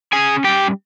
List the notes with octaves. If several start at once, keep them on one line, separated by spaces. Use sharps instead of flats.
C#4 G#4 G#5
G3 G4 G5